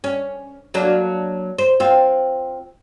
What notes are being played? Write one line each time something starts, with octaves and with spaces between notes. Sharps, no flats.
C#4
F#3 A#3 D4
C5
C4 F4